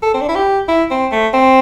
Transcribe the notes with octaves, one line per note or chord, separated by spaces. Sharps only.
A4
C4
D4
E4
G4
E4
C4
A3
C4